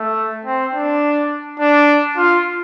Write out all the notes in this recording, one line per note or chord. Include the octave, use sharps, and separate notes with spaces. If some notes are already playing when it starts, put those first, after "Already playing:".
Already playing: A3
C4
D4
D4
F4